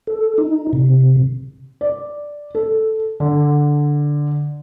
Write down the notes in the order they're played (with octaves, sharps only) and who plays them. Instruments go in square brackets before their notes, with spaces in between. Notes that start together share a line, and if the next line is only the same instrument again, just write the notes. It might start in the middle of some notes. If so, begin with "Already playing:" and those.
[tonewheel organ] A4
D#4
C3
[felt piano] D5
A4
D3